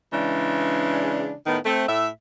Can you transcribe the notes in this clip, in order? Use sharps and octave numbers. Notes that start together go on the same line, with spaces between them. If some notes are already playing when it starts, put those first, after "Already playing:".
C#3 E3 G#3 D4
A2 D#3 B3
A3 C4
A2 E5